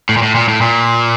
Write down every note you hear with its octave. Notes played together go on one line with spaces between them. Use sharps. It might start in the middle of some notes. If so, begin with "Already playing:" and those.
A2
A#2
A2
A#2
A2
A#2